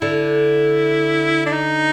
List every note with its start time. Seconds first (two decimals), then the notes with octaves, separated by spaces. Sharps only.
0.01 D3 E4
1.46 D4
1.53 D#4